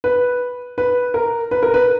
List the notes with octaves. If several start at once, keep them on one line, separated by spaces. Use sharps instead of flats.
B4
B4
A#4
B4
A#4
B4